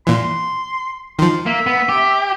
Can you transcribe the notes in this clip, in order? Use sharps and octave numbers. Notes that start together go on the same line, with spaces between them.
A#2 E3 C6
D#3 F3 C6
A#3 E5
B3
G4